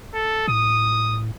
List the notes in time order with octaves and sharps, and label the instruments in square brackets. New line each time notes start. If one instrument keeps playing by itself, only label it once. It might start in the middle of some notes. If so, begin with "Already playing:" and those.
[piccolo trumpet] A4
[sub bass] A2 [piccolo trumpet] D#6